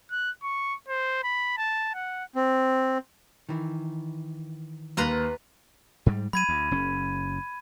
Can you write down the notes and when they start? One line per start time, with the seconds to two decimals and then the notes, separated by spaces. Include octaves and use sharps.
0.11 F#6
0.43 C#6
0.88 C5
1.24 B5
1.57 A5
1.95 F#5
2.35 C4
3.49 D#3 E3
4.97 D#2 B4 A#5 C6
6.06 G#2 G3
6.33 F#3 B5 G#6 D#7
6.49 D2
6.71 F#1 C#4